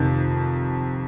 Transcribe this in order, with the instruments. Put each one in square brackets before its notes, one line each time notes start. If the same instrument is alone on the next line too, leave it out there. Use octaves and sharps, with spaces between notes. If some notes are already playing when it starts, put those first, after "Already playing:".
Already playing: [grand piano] F2 C3 D#3